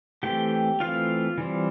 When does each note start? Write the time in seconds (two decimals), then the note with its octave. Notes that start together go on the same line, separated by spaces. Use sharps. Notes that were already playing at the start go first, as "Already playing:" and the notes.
0.23 E3 A3 C4 G4 G5
0.80 E3 A3 C4 F4 F5
1.38 E3 G3 C4